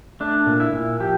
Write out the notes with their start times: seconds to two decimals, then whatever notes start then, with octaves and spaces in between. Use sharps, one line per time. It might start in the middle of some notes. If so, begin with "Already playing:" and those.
0.20 A3 D4
0.46 A#2
0.60 E4
0.73 A#2
1.00 F3 G4